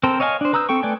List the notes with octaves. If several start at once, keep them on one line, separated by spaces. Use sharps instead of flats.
C4 A4 A#4 C5
C#5 D#5 F5 G5 G#5
D4 C5
B4 A#5 D#6 E6 G6
C4 A4 G5 C#6
A3 B4 D5 G5 G#5